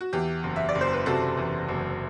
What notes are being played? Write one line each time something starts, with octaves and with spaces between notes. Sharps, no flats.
F#4
E2 G4
F#1
E5
D5
F#1
C5
B4
C3 F#4 A4
E2
F#1